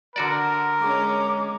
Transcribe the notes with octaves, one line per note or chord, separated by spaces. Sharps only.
D3 F#4 A#4 D5
G#3 C#4 D6